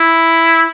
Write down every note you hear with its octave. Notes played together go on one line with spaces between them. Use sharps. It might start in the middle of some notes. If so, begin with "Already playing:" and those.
Already playing: E4